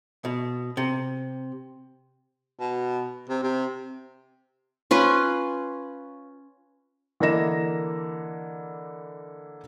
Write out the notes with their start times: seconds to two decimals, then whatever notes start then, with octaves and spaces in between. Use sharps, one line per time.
0.25 B2
0.77 C3
2.60 B2
3.29 C3
3.43 C3
4.91 C#4 F4 B4
7.20 D3 E3 A#3 D#5 A#6 E7